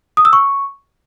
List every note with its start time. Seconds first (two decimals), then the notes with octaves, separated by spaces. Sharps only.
0.17 D#6
0.25 E6
0.33 C#6